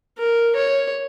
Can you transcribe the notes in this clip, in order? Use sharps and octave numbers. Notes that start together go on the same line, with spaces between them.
A#4
C#5